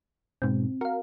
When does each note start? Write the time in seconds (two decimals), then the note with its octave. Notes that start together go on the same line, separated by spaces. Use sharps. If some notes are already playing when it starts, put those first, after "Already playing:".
0.42 G#2 B2 C4
0.81 F#4 A#4 F5